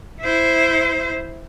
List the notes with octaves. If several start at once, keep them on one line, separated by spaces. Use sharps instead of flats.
E4 C5